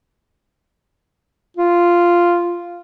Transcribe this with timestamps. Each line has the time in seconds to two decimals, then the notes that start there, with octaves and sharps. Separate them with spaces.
1.57 F4